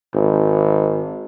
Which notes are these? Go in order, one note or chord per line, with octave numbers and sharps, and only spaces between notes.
G#1